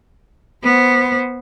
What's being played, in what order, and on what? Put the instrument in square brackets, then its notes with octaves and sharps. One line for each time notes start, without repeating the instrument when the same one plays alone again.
[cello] B3 C5